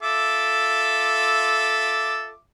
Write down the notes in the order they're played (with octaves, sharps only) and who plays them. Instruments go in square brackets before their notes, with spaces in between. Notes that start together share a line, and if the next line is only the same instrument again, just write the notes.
[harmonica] F4 E5 D6 [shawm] A4